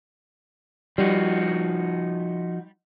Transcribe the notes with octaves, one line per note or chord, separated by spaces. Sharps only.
F3 G3 D#4 F#4